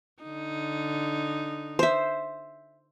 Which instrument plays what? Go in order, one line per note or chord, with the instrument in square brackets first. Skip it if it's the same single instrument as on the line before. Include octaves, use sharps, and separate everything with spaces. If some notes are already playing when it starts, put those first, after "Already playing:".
[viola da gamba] D3 D#4
[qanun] C5 E5